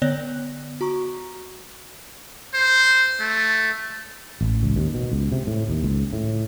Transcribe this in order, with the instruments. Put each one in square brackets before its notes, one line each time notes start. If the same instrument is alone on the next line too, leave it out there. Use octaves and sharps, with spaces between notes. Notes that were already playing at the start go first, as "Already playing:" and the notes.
[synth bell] D3 B3 C#5 D5 F#6 A#6
F#4 A#5 C#6
[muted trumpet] C5
A3
[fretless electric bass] A1
C#2
D#2
B2
C#2
C3
A2
D#2
C#2
A2